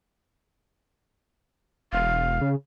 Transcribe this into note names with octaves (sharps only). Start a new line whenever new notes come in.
E1 F5
C#3